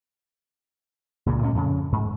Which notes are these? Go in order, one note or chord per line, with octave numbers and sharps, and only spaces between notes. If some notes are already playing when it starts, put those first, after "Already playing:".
C#2 A#2 C#3
D2 A2 G#3 C#4
F2 C#3
G#2